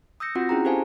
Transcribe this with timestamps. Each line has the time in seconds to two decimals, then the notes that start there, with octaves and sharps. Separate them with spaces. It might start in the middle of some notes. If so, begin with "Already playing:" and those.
0.20 D#6 E6 G6 A#6 C#7
0.35 C4 F4 F#4 F#5
0.49 C#4 E4 G#4 G5 A#5
0.65 G4 A4 C5 F5 G#5 A5